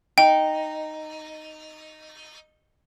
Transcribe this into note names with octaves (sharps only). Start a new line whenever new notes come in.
D#4 G5